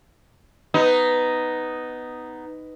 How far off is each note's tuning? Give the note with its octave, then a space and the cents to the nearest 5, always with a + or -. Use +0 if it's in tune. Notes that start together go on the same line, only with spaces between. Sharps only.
B3 +10 D#4 +0